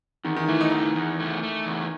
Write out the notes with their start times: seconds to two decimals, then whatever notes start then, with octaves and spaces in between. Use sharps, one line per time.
0.24 E2 D#3
0.36 D#3
0.48 E3 A3
0.61 D#4
0.72 E2 D#4
0.95 E2
1.20 A3
1.43 A3
1.66 E2